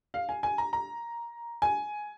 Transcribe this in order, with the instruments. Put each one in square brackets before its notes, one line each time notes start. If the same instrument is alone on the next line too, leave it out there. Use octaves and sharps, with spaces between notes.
[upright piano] F5
G#5
G#5
A#5
A#5
G#5